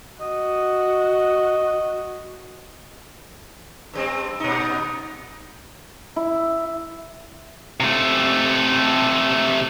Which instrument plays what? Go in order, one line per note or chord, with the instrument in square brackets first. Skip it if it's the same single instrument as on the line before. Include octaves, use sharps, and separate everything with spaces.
[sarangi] F#4 [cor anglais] D#5
[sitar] G2 G3 C4
A#2 D#4
[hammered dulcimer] E4
[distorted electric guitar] C3 A3